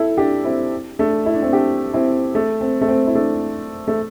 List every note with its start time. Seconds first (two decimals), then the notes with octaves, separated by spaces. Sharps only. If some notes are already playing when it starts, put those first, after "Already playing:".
Already playing: E4 A4
0.18 D4 G4
0.44 C4 E4
0.99 A3 D4
1.26 E4
1.34 D4
1.42 C4 E4
1.53 D4 G4
1.93 C4 E4
2.35 A3
2.61 C4
2.81 A3
2.88 C4
3.07 E4
3.15 A3 D4
3.88 A3